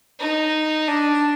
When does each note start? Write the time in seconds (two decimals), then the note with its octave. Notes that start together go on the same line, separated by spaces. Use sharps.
0.20 D#4
0.88 D4